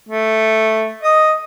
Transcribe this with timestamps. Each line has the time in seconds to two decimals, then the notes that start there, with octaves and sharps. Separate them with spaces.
0.09 A3
1.03 D#5 D#6